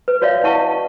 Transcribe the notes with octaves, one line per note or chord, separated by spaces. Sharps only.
B4
F#4 C#5 D5 E5 F5
E4 D#5 F#5 A5 C#6